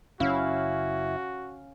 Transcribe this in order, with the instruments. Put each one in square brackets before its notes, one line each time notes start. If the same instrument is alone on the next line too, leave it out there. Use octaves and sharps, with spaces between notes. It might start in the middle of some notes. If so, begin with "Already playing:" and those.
[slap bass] F#1 [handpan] C#4 F5 [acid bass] E4 [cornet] F#4